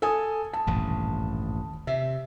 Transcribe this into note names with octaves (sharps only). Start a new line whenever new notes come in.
A4 G#5 D#6
A5
D#1 A1 G2
C3 E5